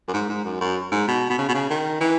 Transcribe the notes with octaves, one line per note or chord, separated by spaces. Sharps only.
F#2
G#2
G#2
F#2
F#2
G#2
B2
B2
C#3
B2
C#3
D#3
E3